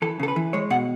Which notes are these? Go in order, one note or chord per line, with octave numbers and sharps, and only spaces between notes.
E3 A4
C#3 A4
B4
E3
G#3 C#5
B2 F#5